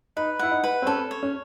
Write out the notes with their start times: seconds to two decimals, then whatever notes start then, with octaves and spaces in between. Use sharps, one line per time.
0.17 D#4 B4
0.39 E4 F#5
0.51 D#4
0.64 B4
0.82 C4
0.86 C#4 A4
1.11 C#5
1.23 C#4